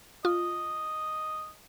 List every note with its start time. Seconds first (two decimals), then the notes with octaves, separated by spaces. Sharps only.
0.25 F4 D#5